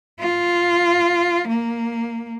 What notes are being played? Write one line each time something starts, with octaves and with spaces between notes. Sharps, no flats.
F4
A#3